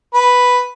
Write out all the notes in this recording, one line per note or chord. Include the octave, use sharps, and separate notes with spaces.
B4